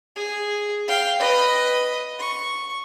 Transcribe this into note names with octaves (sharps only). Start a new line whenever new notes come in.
G#4
F5 G5
B4 D#5
C#6